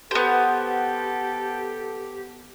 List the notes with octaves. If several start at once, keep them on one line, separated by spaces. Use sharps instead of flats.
B3 G4 A4 C5